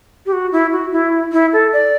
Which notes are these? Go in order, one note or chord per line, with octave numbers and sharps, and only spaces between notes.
G4
F#4
E4
F#4
E4
E4
A4
D5